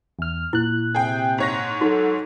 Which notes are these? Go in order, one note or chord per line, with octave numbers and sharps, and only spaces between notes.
E2 F6
A#2 E4 F#6
C3 G#4 G5
G#2 C#5 A#6
F#3 D#4 F#4 A4